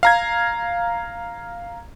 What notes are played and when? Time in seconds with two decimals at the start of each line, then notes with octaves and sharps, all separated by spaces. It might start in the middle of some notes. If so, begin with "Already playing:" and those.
0.03 F5 A#5 G#6